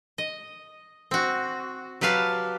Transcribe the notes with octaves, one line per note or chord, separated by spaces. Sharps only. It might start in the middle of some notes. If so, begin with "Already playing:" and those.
D#5
C4 F#4
F#3 G4 B4 F5 A5